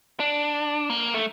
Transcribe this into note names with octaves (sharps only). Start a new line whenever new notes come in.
D4
A#3
A3